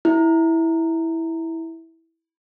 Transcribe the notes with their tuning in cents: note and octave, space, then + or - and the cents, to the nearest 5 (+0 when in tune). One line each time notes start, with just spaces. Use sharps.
E4 -10